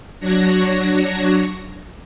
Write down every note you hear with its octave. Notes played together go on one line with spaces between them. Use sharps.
F#3 D4 F#4 C#5 A#6